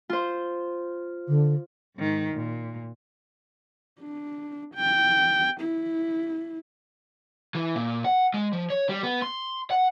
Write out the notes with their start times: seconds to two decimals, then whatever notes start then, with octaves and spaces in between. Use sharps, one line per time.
0.09 F4 C5
1.28 D3
1.96 G#2 D#3
2.34 A#2
4.01 D4
4.75 G5
5.61 E4
7.55 E3
7.76 A#2
8.05 F#5
8.34 G#3
8.53 F3
8.70 C#5
8.89 G3
9.03 B3
9.22 C6
9.71 F#5